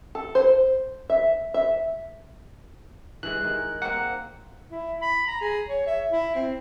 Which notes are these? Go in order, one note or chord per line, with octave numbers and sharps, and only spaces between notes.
A4
C5
E5
E5
E3 G#3 F#6
D#3 G#3
A#3 C4 F#5
E4
B5
A#5
G#4
C#5
E5
E4
C4